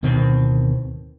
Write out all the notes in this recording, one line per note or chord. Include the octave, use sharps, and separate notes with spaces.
D1 B2 D#3 C4